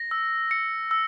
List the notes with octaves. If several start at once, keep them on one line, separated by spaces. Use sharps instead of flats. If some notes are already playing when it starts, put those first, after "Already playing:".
Already playing: A#6
E6
C#7
E6